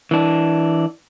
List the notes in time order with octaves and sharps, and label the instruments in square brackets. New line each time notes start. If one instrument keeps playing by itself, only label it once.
[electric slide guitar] E3 D4